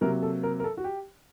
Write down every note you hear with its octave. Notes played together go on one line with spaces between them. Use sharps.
C3 F#3 A#3 A#4
A4
A#4
A#4
A4
F#4
G4